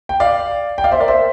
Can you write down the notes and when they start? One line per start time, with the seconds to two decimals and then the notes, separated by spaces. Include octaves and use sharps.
0.09 G5
0.20 D5 F5
0.78 G5
0.84 D5 F5
0.92 C5 E5
1.00 A#4 D5
1.08 C5 E5